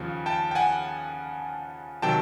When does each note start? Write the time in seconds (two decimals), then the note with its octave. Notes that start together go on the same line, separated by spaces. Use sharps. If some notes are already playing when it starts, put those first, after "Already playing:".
Already playing: D#2 C#3 F3
0.26 G5 A5
0.51 G5
0.55 F#5 G#5
2.02 C3 D#3 F#3 G5 A5